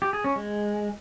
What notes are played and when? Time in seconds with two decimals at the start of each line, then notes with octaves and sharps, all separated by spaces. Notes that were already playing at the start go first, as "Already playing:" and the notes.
0.02 G4
0.13 G#4
0.24 C#4
0.36 G#3